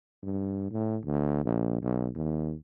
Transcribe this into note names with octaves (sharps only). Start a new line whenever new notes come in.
G2
A2
D2
A#1
B1
D#2